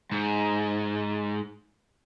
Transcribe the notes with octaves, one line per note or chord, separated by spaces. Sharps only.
G#2